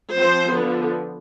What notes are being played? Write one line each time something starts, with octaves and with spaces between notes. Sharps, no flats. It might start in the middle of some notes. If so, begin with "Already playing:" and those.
F3 C4 C5
D3 F3 B3